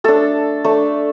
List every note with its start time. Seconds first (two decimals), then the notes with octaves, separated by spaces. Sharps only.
0.04 A3 D4 A4
0.64 A3 D4